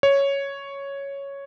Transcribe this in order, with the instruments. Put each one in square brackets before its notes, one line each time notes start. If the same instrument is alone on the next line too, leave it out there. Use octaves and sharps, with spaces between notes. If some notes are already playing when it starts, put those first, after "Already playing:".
[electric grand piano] C#5